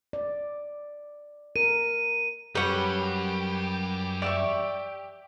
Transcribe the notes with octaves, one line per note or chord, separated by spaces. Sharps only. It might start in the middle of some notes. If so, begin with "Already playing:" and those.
D5
A#4 D#7
F#2 F#3 G3 G4 B4 C#5 F#5
D5 E5 C#6